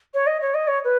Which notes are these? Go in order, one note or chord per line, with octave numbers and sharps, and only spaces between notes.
C#5
D#5
C#5
D#5
C#5
B4